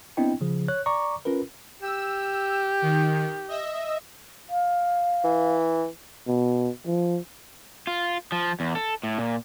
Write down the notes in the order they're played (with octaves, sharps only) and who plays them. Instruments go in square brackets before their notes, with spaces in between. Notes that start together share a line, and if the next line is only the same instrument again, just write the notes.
[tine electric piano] B3 C4 D4 E4 D#5 G5
C#3 F3 G#4
C#5 F#6
D5 A#5 C#6 D6
C#4 F4 A#4 B4
[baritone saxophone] G4 [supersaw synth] E6
[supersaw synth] D#3
D#5 E5
[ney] F5
[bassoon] E3
[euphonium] B2
F3
[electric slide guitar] F4
F3
E2
A4
A2
A#2